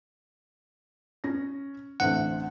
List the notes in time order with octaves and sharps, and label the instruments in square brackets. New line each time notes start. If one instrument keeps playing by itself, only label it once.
[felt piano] C#4 A#6
[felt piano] A1 D2 C4 [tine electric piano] F#5